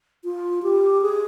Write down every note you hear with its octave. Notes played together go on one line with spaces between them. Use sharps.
F4
G4
G#4